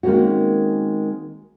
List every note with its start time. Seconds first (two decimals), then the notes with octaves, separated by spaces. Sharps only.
0.03 D#3 G#3 A#3 C4 C#4 F#4